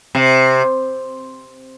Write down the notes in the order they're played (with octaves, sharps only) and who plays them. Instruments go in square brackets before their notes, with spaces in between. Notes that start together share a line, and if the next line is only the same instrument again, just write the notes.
[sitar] C3